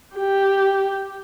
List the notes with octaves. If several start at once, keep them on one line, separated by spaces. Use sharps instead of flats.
G4